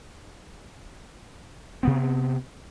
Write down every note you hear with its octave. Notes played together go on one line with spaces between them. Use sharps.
C3 B3 C4